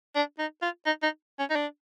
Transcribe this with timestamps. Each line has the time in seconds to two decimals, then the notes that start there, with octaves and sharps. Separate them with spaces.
0.15 D4
0.39 D#4
0.62 F4
0.86 D#4
1.03 D#4
1.39 C#4
1.50 D#4
1.55 D4